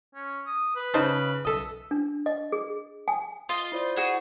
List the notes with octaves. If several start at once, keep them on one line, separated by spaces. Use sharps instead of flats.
C#4
D#6
B4
C#3 D#4 C5 A5
B1 A4 D#5 E5
D4
D#5
G#4
G#5
F4 D#5
E4 C5 D5
F#4 G#4